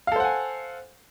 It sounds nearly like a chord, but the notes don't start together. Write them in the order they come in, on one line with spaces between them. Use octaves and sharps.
F5 A4 C5 F#5 G#5